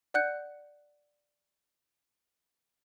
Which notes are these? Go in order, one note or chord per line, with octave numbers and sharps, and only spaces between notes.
D5 F#5 F#6 G6 C#7